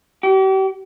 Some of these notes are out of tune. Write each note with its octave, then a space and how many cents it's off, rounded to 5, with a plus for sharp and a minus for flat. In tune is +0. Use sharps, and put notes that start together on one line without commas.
G4 -40